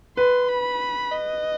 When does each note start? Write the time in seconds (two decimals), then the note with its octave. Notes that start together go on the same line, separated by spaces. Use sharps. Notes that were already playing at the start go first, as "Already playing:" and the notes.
0.17 B4 C6
0.49 B5
1.12 D#5